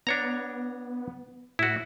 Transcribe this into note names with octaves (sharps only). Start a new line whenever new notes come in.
B3 D4 C#5 A#5
A2 E4 F#4